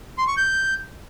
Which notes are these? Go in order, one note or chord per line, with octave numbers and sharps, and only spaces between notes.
C6
C#6
G6